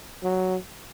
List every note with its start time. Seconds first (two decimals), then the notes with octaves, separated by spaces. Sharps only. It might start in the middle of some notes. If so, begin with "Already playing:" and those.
0.23 F#3